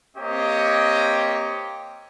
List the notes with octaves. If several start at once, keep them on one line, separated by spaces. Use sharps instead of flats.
A#3 C4 G4 C#5 D#5